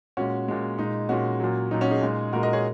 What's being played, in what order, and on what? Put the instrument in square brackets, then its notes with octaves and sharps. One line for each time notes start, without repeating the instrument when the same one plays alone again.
[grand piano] A#2 G#3 C#4 F#4
A#2 G#3
A#2 G#3 D#4
A#2 G#3 C#4 F#4
A#2 F#3
A#2 F#3 D#4
C#4 F#4
D#4 G#4
A#2 G#3
A#2 G#3 F#4 A#4
A#4 D#5
G#4 C#5